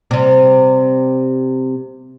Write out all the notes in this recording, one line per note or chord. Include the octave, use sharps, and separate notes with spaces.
C3 G3